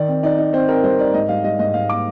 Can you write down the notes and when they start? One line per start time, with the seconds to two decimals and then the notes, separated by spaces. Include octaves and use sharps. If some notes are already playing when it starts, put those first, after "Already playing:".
Already playing: D#3 D5
0.08 C4
0.23 D#4 D5
0.38 D#4
0.53 C4 C5
0.68 C4 A#4
0.84 G3 C5
0.99 D#4 D5
1.14 G#2 D#5
1.29 G3 F5
1.44 G3 D#5
1.59 G#2 D#5
1.74 G#2 F5
1.90 A#3 D6